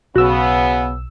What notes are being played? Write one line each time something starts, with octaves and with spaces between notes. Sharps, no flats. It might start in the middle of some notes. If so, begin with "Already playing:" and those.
B1 C#3 B3 F#4 E6